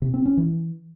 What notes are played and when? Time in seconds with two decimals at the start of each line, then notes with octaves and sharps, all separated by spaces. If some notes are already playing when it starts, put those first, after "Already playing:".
0.02 C3
0.14 C4
0.26 C#4
0.37 E3